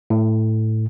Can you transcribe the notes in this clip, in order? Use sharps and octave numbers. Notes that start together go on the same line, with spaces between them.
A2